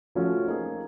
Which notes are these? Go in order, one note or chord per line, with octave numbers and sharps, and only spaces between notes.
F3 A3 C#4 F#4 A4
A#3 D#4 G#4